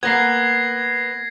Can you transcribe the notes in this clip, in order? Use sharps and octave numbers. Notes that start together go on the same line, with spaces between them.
A#3 B3 G#6 A#6 C7